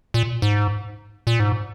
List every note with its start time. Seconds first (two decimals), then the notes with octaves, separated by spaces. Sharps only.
0.14 A#2
0.42 G#2
1.27 A#2
1.40 G#2